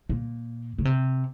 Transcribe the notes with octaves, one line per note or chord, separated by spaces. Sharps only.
A#2
C#3
C3